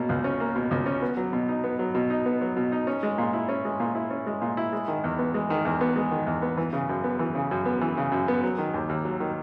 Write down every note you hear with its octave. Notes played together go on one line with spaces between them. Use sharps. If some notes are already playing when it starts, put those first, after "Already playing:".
Already playing: B2 A#3 C#4
C#2
C#4
A#3
B2
C#2
C#4
B3
F#3
B2
D#4
B3
F#3
B2
D#4
B3
F#3
B2
D#4
C#4
G#3
A#2
E4
C#4
G#3
A#2
E4
C#4
G#3
A#2
E4
G#3
D#3
E2
B3
G#3
D#3
E2
B3
G#3
D#3
E2
B3
E3
C#3
F#2
B3
E3
C#3
F#2
B3
E3
C#3
F#2
B3
F#3
D#3
D#2
D#2
F#3
D#3